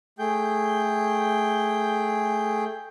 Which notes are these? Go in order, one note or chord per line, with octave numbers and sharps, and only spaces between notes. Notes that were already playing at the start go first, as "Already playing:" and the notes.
A3 G#4 G5 G6